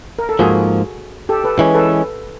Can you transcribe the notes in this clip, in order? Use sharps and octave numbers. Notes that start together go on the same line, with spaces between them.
A#4
A4
G#2 F3 A#3 F#4 G#4
G4 A4
A4 B4
E3 G#3 C#4
A4 B4